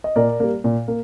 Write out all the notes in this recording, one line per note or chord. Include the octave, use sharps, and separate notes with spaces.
D#5
A#2 A#4 D5
G3 A#3
A#2
A#3